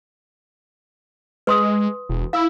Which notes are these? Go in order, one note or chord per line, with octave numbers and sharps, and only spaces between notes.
G#3 B4 C6 D#6
E1
E4 F5 E6